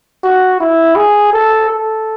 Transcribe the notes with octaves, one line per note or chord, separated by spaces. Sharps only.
F#4
E4
G#4
A4
A4